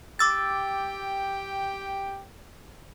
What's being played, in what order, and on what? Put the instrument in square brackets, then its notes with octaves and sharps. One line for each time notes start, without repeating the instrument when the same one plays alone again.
[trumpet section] G4 G5 [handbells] D6 E6 A6